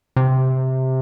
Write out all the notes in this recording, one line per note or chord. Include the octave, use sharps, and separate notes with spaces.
C3